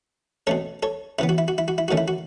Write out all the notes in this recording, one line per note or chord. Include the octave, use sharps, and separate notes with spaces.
B2 A3 C#4 A4 C#5
A4 C#5
C#3 E3 B3 E4
F#4
E4
F#4
E4
F#4
E4
D#3 A3 C#4 F#4
E4
F#4